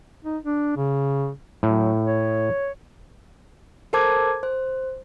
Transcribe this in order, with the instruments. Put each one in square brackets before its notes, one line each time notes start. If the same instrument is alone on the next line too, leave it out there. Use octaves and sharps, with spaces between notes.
[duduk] D#4
D4
C#3
[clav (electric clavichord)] A2 [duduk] F#3
[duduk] C#5
[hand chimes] A4 A#4 C5 A5 D6 G#6
C5